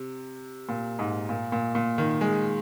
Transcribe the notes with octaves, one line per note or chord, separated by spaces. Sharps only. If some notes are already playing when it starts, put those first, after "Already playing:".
Already playing: C3
A#2
G#2
A#2
A#2
A#2
D#3
G#3